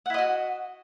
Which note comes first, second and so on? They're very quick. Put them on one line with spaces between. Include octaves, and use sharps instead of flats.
F#5 E4 D#5 F#4